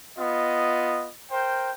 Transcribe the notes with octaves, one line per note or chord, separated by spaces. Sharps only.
B3 F4 D#5
A#4 C5 G5